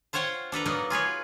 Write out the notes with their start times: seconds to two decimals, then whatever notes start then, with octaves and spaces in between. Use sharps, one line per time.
0.13 F4 C5 C#5 F#5 G5
0.52 D4 A4 B4 A#5
0.66 F#3 A#3 B3 D#4 A#4
0.90 F4 G#4 B4 C#5